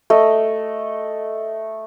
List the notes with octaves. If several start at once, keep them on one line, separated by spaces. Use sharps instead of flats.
A3 D#5